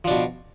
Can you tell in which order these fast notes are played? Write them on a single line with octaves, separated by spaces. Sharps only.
F3 D4 B2